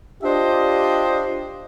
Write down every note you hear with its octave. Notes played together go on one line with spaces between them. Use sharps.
D4 F4 G4 C5 D5 D#5